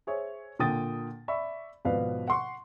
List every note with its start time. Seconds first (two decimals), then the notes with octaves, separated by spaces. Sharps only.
0.07 G#4 C5 C#5 E5
0.59 A#2 D3 G5 D#6 A6
1.28 D5 E5 B5 C#6
1.85 G#1 B2 F3 B4 D5 F5
2.28 F#5 C6 C#6